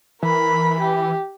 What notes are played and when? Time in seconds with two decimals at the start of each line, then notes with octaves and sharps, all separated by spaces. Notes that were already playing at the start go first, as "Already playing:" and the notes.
0.23 E3 A#4 B5
0.80 G4